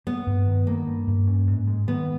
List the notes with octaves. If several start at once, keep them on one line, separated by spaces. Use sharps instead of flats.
A#3 B3
G2
D#3
G2 A#3
G2
G2
C#4
G#2
G#3
D#3 B3